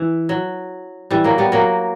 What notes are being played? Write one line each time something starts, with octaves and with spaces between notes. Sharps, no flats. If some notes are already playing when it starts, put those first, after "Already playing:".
Already playing: E3
F#3
E3 G3
F#3 A#3
G3 B3
F#3 A#3